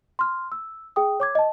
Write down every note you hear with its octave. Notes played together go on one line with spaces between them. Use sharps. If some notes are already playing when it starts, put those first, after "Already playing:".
C6 F6
E6
G#4 G5 D#6
C#5 D6 G#6
D#5 A5